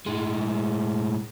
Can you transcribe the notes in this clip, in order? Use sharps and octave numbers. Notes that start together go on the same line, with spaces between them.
A2 G#3